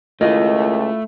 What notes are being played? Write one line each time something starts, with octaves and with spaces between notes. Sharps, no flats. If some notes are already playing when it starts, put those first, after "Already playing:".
C#2 A3 E4 F4 A#4 D#5